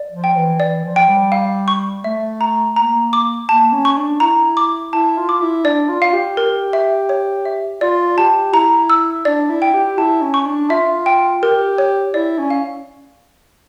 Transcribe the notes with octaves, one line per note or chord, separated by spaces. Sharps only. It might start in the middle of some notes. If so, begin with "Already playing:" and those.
Already playing: D5
F3
G5
E3
E3 D5
F3
G5
G3
F5
C#6
A3 E5
A#5
A#3 A#5
D6
A#3 A5
C#4
C#6
D4
E4 A#5
D6
E4 A5
F4
D6
E4
D4 D5
F4
F5
G4
A#4
E5
C#5
E5
F4 D5
G4 A5
E4 A#5
E6
D4 D5
E4
G5
G4
E4 A5
C#4
C#6
D4
F4 E5
G5
G4 A#4
C#5
E4 D5
C#4
F5